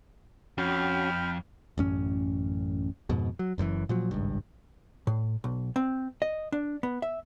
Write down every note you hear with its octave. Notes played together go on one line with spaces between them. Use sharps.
F2 C#4 F#4 G5 B5 F6
A1 F#2 C#4
F2 G#2 B2
F#3
F#1 F#2 A2 E3
A#2 F3 F#3
G#1 C#2 G2
A2
B1
C4
D#5
D4
B3
E5